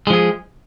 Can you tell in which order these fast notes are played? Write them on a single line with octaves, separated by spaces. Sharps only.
G#3 F3 G#4